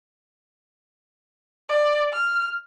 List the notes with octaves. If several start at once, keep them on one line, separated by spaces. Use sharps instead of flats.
D5
F6